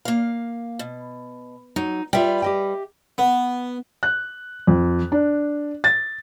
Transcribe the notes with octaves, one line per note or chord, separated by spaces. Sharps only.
A#3 F5
B2
F#3 D#4
G3 F4 B4 E5 G5
G4 D#5 G5
B3
F#6
F2
D4
A6